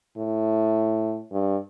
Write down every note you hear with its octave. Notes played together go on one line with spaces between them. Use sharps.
A2
G2